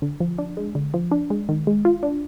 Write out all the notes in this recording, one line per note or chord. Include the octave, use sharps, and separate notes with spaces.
D3
F3
D4
G#3
D3
F3
D4
G#3
D#3
G#3
F4
D4